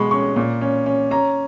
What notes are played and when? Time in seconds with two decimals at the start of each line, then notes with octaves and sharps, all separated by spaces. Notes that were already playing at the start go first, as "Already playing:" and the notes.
Already playing: B2 G#3 B5 C#6
0.11 C#4 C#6
0.36 A#2
0.61 C#4
0.86 C#4
1.11 C#4 A#5